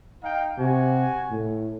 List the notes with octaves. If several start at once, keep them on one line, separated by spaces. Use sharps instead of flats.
D#4 F5 G5
C3 F#4 G#5
A2